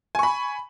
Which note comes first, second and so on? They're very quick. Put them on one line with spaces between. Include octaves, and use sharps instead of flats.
G#5 C#6 B5